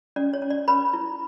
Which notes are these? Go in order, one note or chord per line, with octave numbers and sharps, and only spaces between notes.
C#4 D5
C#5
C#4
D5
C#4 B4 B5
E4